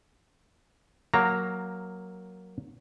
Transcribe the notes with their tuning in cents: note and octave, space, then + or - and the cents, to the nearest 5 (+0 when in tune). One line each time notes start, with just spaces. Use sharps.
F#3 +0 A#3 +0 A#5 -15